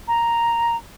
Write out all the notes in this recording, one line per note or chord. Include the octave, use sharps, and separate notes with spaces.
A#5